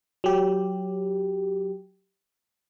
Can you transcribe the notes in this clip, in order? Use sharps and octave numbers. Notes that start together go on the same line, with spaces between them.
F#3 G4